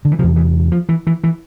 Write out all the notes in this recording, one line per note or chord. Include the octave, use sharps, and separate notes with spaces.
D3
E3
E2 C3 F3
E3
F3
E3
E3
E3